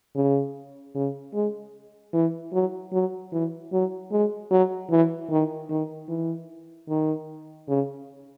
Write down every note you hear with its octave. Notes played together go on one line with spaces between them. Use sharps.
C#3
C#3
G#3
E3
F#3
F#3
E3
F#3
G#3
F#3
E3
D#3
D#3
E3
D#3
C#3